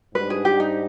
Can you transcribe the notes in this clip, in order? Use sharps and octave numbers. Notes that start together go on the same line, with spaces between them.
G#2 G3 D4 B4
G#4
G4
D#4